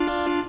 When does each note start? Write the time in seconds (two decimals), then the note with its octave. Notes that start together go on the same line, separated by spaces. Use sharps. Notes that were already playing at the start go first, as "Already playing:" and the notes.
Already playing: D4 F4